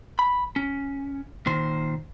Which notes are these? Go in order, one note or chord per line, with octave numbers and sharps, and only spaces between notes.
B5
C#4
A#2 D#3 C5